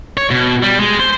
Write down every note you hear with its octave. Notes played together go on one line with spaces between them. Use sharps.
C#5
B2
G3
G#3
C5